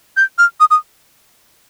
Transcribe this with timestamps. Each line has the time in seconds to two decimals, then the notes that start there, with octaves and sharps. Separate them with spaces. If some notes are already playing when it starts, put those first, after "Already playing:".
0.17 G6
0.38 F6
0.60 D#6
0.71 D#6